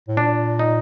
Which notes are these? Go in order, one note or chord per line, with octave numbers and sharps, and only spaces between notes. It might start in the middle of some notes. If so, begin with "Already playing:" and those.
A2
A#2 D4
D#4